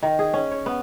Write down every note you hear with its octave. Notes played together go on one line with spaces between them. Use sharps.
D#3
G#4
C#4
C#5
B3